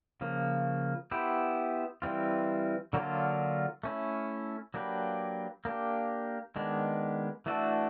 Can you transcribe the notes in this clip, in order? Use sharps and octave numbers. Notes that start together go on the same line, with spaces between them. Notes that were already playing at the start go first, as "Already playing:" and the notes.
C#3 F3 A#3
B3 E4 G4 C5
E3 G3 C4 F4
D3 F#3 A#3 D4 F4
A3 C#4 E4
F#3 A#3 D4 G4 B4
A#3 D4 G4
D#3 G#3 B3 D4
E3 A3 D4 F#4 A4